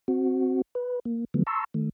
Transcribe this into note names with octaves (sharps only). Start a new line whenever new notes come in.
C4 F#4
B4
A#3
D3 F3 F#3 A3 B3
A5 A#5 C6 C#6 E6
D#3 A3